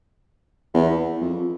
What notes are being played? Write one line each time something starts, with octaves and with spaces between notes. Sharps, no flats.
E2
F2